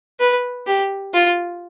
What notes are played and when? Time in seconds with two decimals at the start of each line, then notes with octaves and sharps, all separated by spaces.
0.20 B4
0.67 G4
1.14 F4